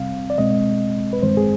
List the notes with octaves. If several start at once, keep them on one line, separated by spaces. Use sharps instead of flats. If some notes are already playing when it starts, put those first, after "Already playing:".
Already playing: C2 C3 G3 C4 F5
D5
B2 G#3 C4 D#5
B4
G2 D#3 G#3 C4 C5
G#4